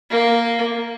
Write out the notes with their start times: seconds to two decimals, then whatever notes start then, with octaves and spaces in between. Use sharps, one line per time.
0.10 A#3